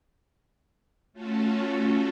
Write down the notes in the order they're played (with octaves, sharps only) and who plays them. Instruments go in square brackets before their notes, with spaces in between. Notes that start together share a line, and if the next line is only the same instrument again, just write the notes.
[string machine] A3 C#4 F4 F#4 A4